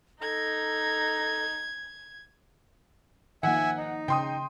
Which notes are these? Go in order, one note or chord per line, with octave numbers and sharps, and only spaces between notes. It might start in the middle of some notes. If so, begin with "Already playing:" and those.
D#4 A4 A#5 G#6
D#3 F3 A#3 E5 F#5 G#5
D#4
C#3 G5 C6 D#6